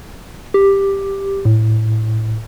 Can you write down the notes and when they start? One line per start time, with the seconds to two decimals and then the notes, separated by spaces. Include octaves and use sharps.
0.54 G4
1.45 A2